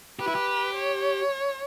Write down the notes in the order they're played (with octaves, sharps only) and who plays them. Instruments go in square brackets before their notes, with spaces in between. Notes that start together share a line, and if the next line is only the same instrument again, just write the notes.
[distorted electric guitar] G4 [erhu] B4
[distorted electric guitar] E4
G4
[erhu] C#5